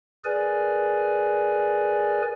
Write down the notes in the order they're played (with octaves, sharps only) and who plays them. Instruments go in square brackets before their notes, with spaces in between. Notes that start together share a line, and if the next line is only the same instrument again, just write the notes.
[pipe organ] G#4 A#4 B4 D5 G#5